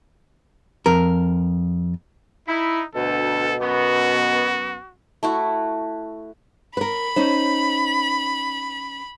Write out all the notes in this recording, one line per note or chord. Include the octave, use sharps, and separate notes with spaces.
F2 A#4
D#4 E4
D2 B2 A4
F#2 B3 F#4
A3 E4 F#4
A#4 B4 B5
C#4 D#4 C5